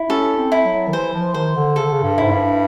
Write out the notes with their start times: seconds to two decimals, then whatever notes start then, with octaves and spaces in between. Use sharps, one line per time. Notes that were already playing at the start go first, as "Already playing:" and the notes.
Already playing: E4
0.09 C#4 A4
0.38 C4
0.52 E4
0.66 F#3
0.87 D#3
0.93 E3 C5
1.14 F3
1.34 D#3 C5
1.56 D3
1.76 C#3 A4
1.84 D3
1.91 C#3
2.03 G2
2.18 G#2 E4
2.31 G2